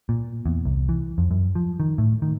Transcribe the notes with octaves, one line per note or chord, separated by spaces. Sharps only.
A#2
E2
C2
E3
F2
F#2
F3
D#3
A2
D#3